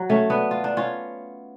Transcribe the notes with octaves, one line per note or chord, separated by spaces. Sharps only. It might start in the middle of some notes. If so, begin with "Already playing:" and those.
Already playing: F#3
A3 C#4
B3 D4
F4
D4
C#4 F4